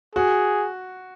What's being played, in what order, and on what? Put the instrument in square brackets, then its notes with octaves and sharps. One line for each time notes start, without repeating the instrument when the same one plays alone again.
[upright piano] F#4 [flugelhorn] G#4